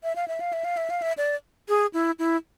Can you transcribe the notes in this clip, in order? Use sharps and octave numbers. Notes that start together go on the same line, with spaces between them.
E5
F5
E5
F5
E5
F5
E5
F5
E5
D5
G#4
E4
E4